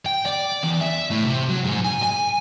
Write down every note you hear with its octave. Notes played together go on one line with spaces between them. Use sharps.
G5
D5
E2
E5
A2
C3
F#3
G#2
G#5
G#5